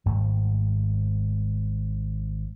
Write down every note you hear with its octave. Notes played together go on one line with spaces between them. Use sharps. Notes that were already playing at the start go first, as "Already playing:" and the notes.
G#1 G#2 G3 A3